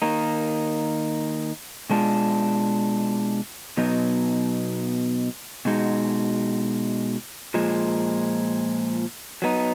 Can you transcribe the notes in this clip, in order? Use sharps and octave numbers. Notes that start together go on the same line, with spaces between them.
D#3 A#3 D#4
B2 G#3 D4 F4
B2 F#3 B3 D#4
B2 G#3 D#4 F#4
A#2 F3 G#3
F#3 B3 D#4